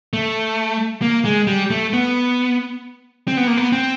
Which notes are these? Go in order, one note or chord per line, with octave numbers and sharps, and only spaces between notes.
A3
A#3
G#3
G3
A3
B3
C4
B3
A#3
B3
C4